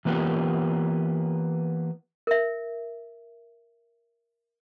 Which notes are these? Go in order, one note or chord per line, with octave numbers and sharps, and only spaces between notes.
E3 A#3 B3 F4 G4
A#4 E5